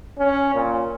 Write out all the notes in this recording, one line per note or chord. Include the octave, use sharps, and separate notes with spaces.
C#4
A#2